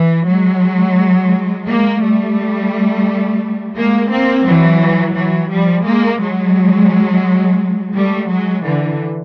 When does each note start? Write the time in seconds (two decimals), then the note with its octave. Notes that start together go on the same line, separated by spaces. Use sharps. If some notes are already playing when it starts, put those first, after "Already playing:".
Already playing: E3
0.27 F#3 G#3
1.68 G#3 A#3
2.02 G3 A3
3.77 G#3 A#3
4.11 A#3 C4
4.46 E3 F#3
5.16 E3 F#3
5.51 F3 G3
5.85 G#3 A#3
6.21 F#3 G#3
7.95 G3 A3
8.29 F#3 G#3
8.64 D3 E3